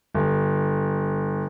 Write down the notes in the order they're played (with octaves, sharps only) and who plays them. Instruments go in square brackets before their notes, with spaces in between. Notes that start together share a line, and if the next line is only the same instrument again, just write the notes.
[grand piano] G1